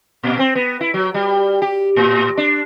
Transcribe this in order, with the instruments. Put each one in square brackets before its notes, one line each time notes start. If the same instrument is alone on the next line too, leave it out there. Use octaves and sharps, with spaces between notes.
[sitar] A#2
C4
B3
E4
F#3
G3
G4
A2
D4